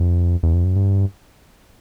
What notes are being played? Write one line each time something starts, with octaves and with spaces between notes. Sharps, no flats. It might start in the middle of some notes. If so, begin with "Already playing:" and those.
Already playing: F2
E2
F2
F#2
G2